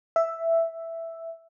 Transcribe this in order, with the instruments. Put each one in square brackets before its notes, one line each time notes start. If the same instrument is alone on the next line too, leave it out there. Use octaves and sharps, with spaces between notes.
[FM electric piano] E5